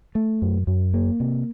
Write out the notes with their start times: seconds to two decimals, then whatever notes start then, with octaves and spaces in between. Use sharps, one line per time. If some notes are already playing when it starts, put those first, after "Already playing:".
0.15 A3
0.42 F#2
0.67 F#2
0.94 A#3
1.20 C3